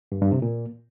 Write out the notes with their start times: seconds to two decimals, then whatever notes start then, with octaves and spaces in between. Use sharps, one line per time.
0.12 G2
0.22 G2
0.32 C3
0.42 A#2